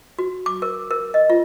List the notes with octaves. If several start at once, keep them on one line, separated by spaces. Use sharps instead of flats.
F#4
D6
A#4
A#4
D#5
F4